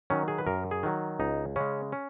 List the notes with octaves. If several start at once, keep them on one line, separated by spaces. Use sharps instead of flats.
D#3 F#3 C#4
G#4
B4
F#2 A#4
G#4
D#3 F#3
C#2 D#4
C#3 G#3 C#4
C#4